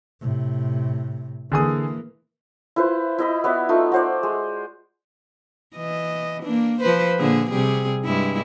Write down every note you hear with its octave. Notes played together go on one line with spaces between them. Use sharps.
A2 C3
D3 E3 A#3 G#4 D#6
E4 F4 B4 C5
E4 D#5 B5
B3 F#4 D5 E5
A3 D#4 F4
F#4 C5 D5
G#3
E3 D#5
A#3 D4
F3 B4 C5
A#2 D3 G#4
C3 G3 G#4
G2 G#3 E4